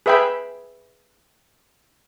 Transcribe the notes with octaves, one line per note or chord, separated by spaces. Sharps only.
G#4 B4 E5 G5 B5